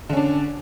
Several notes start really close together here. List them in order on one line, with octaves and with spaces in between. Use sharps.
D3 C#4 D4